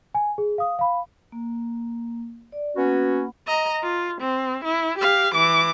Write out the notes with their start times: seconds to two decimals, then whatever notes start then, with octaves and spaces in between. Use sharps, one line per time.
0.15 G#5
0.38 G#4
0.58 F5 D#6
0.79 F5 B5
1.32 A#3
2.52 D5
2.76 A#3 B3 C#4 F#4 F#5 B5
3.47 D#5 A#5
3.83 F4
4.21 C4
4.65 E4
4.98 G4 F5
5.34 E3 D6